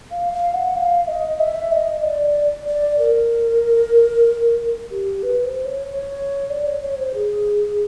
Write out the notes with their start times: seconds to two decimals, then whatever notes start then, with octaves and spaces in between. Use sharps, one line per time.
0.11 F5
0.33 F5
0.54 F#5
0.75 F5
1.08 D#5
1.40 E5
1.72 D#5
2.04 D5
2.67 D5
2.99 A#4
4.91 G4
5.23 B4
5.44 C5
5.65 C#5
5.87 C#5
6.50 D5
6.66 C#5
6.82 C#5
6.98 C5
7.14 G#4